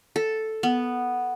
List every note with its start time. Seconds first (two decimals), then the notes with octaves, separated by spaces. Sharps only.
0.16 A4
0.63 B3